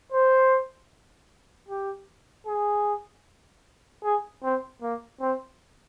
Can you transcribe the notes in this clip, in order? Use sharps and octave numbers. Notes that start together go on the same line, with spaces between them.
C5
G4
G#4
G#4
C4
A#3
C4